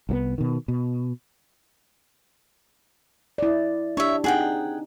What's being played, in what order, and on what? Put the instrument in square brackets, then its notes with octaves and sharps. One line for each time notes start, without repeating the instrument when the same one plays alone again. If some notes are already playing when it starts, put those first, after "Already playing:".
[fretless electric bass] C2 E3 B3
B2 D#3
B2
[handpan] E4 D5
[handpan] D4 G4 [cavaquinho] C#5 E5
[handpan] C4 D#4 [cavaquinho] G#4 F#5 G5